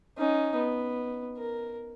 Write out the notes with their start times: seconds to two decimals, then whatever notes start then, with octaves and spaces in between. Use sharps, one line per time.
0.17 C#4 D#4
0.56 B3
1.38 A#4